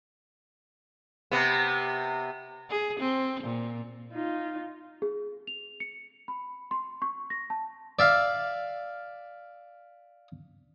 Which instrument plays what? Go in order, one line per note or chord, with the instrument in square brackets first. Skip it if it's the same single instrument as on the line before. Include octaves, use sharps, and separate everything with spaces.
[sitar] C3 B3
[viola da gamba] G#4
C4
A#2
[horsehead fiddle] D#4 F4
[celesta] G#4
F7
C#7
B5
C6
C#6
A#6
A5
[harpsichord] D5 E5 F5